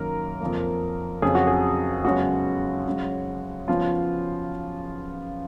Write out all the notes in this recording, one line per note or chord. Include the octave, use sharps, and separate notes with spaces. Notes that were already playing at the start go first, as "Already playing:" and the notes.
Already playing: F#2 D#3 A#3 A#4
F2 F3 A#3
F2 C#3 F#3 G#4
F#4
G#4
F#2 C#3 G#3 B3 F#4
F#2 C#3 G#3
C#3 F3 B3 F4